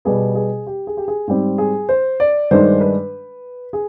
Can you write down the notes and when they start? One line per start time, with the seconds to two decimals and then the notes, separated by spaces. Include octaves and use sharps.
0.05 B2 G3 B3 G#4
0.35 G#4
0.67 G4
0.87 G#4
0.97 G4
1.08 G#4
1.27 G#2 G3 C4 G4
1.58 G#4
1.89 C5
2.20 D5
2.51 G2 D#3 G#3 D4 C5
2.81 B4
3.73 G#4